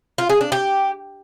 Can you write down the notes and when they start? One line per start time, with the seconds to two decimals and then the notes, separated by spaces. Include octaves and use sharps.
0.18 F4
0.29 G#4
0.41 D4
0.52 G4